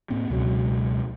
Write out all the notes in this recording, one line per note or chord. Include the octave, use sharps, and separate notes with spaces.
A2 A#3 C4
C#2 B2 F#3 G#3